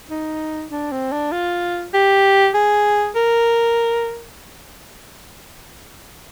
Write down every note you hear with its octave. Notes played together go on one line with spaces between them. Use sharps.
D#4
D4
C4
D4
F4
G4
G#4
A#4